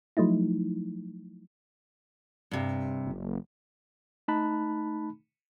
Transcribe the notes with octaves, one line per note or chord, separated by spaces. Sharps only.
F3 F#3 A3 D#4 E4
G2 C3
F#1
A3 D#4 A5 B5 F#6